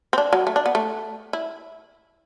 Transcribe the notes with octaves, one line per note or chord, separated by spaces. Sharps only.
C4
D4
F#3
A3
D4
B3
A3
E4